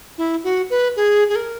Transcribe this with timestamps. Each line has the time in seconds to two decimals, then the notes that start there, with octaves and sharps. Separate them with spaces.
0.18 E4
0.44 F#4
0.70 B4
0.96 G#4
1.29 G#4
1.36 A#4